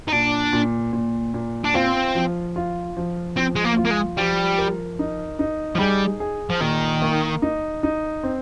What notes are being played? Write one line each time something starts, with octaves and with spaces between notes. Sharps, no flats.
D#4
A#2 D4
A#2
A#2
A#2
D4
C4 F4
F3
F4
F3
F3 C4
G#3
A#3
F4
A#3
G#3
F3 G3
A#4
D#4
D#4
F3
G3 G#4
G#4
F3
A#2 D#3
A#3
D#4
D#4
C4